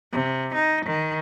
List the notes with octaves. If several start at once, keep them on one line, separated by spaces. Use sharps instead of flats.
C3
D#4
D#3